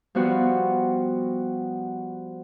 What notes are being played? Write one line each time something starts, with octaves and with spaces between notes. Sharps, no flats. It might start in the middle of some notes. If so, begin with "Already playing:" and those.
F3 G3 B3 F#4